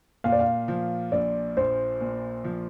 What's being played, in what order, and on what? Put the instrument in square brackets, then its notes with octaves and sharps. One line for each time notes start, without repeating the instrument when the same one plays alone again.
[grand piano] A#2 [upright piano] F5
[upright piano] D5
F5
[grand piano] F3
[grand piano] A#1 [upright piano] D5
[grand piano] A#1 [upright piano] C5
[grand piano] A#2
F3